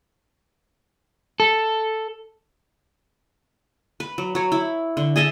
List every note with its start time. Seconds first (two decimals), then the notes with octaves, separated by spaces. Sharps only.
1.40 A4
4.00 B4
4.18 F#3
4.35 F#3 C#5
4.52 E4 B5
4.97 D3
5.16 G#4 D#5 E5 A5